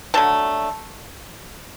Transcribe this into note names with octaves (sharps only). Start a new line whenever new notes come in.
D3 F#3 A3 A5